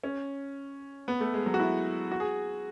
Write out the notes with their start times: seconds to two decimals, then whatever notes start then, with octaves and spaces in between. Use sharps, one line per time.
0.04 C#4
1.08 B3
1.20 A3
1.34 G#3
1.46 F#3
1.54 F#4
1.60 E4
2.12 F#4
2.20 G#4